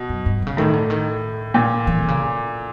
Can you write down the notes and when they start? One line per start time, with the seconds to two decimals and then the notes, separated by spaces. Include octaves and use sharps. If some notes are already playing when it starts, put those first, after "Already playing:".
Already playing: B2
0.09 F#2
0.26 G2
0.42 C3
0.47 C#3
0.57 A2 D#3
0.73 D3
0.90 D#3
1.54 A#2
1.87 E3
1.98 C3
2.08 C#3